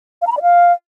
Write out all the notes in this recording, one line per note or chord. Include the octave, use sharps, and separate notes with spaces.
F5
A#5
B5
D5
F5